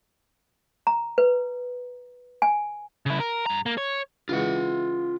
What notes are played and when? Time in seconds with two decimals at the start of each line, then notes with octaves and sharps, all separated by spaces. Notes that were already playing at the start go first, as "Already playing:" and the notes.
0.87 A#5
1.18 B4
2.42 G#5
3.06 C#3 E4
3.20 A#4
3.46 G2 A#5
3.66 A#3
3.77 C#5
4.29 C#3 E3 G#3 F4 F#5